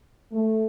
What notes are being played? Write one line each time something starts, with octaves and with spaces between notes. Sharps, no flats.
A3